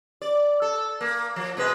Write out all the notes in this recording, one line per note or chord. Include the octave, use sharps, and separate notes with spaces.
D5
A4
A#3
F3
B2 G#3 B4